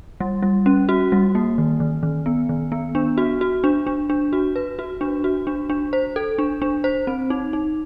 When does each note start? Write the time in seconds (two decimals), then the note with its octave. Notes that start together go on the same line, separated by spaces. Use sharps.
0.20 G3
0.43 G3
0.66 C#4
0.89 F#4
1.12 G3
1.35 A#3
1.58 D#3
1.80 D#3
2.03 D#3
2.26 B3
2.49 D#3
2.72 B3
2.95 D4
3.18 F#4
3.41 F#4
3.64 D4
3.87 D4
4.10 D4
4.33 F#4
4.56 B4
4.79 F#4
5.01 D4
5.24 F#4
5.47 D4
5.70 D4
5.93 C5
6.16 A4
6.39 D4
6.62 D4
6.84 C5
7.07 C4
7.30 D#4
7.53 D#4